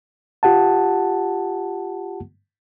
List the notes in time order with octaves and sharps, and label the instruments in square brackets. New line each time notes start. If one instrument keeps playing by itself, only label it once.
[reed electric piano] F4 G4 F#5 A5